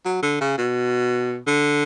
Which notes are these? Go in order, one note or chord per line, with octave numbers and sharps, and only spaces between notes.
F#3
D3
C#3
B2
D3